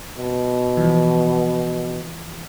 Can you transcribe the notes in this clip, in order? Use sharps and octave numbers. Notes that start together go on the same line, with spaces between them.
B2
E3 F3